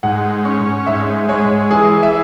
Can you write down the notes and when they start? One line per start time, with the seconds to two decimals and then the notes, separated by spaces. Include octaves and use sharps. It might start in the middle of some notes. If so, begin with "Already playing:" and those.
0.03 G#2 F#5
0.45 C#4
0.87 G#2 E5
1.29 G#3 C#5
1.71 E3 G#4
2.03 E5